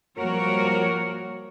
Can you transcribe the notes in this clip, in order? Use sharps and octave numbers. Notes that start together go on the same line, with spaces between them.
F3 G3 A#3 F#4 A#4 C#5